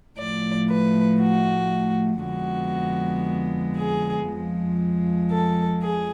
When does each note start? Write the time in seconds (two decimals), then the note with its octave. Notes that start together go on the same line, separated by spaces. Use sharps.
0.19 A2 F3 A3 D5
0.69 B4
1.21 F#4
2.23 F2 D3 G#3 B3 F#4
3.77 G#4
4.28 F2 F3 G#3
5.30 A4
5.82 G#4